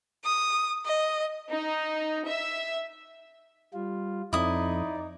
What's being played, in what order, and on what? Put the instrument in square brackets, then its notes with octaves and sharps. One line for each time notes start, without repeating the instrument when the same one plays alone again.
[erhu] D#6
D#5
[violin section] D#4
E5
[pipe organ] G3 F4
[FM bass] F2 [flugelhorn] D#4 [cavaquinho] E4 D#6 [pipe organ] D5